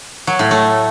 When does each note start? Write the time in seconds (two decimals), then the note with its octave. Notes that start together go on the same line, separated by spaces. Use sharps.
0.27 F#3
0.39 A2
0.51 A3